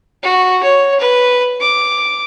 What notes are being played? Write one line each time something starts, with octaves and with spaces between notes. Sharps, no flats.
F#4
C#5
B4
D6